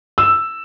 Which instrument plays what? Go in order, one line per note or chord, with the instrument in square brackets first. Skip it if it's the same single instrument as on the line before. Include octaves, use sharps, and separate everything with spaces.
[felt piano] E6